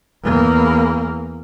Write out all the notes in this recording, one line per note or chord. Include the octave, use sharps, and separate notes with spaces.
E2 A#3